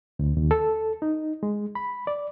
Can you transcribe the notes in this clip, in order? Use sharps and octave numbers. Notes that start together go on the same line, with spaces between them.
D2
D#2
A4
D#4
G#3
B5
D5